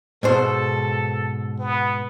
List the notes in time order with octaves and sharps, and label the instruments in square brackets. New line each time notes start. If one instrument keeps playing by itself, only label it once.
[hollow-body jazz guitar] G#2 B2 C5 [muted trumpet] A4
[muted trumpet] B3